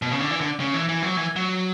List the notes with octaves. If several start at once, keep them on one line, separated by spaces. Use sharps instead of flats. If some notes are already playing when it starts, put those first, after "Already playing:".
B2
C#3
D3
E3
D3
C#3
E3
E3
F#3
E3
F#3